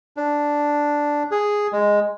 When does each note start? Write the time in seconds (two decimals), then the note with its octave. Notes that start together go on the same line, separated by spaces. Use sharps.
0.17 D4
1.31 G#4
1.73 G#3